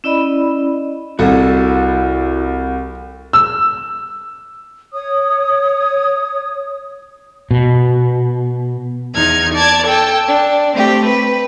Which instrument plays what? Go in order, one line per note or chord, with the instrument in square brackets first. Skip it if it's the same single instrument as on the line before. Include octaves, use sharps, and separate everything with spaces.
[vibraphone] C#4 E4 D5 D#5 B5
[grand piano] C2 [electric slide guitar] E4 F#4 [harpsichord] A4 D#5
[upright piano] E6
[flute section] C#5 D#6
[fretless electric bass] B2
[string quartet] E2 D#4 F6 G#6
D5 A5 G#6
A4 G5 A5
D4
A3 C4 G4
B4